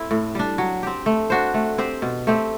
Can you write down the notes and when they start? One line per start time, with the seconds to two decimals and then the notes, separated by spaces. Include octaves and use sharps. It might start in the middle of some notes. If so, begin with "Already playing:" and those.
Already playing: A3 C4 E4
0.11 A2
0.35 G3 D4
0.58 F#3
0.83 C4 G4
1.06 A3
1.30 D4 F#4 C5
1.54 A3
1.78 C4 G4 C5
2.02 B2
2.27 A3 C4 G4